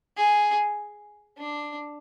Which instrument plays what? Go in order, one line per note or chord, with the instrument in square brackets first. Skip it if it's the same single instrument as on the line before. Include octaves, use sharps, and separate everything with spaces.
[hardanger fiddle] G#4
D4